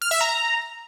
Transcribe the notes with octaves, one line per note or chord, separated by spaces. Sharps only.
F6
E5
A#5